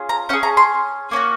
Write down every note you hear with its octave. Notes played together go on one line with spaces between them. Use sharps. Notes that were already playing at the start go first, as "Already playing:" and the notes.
Already playing: C#4 F4 G#4
A#5
C#4 G#4 F#5
A#5
C6
A#3 C#4 F#4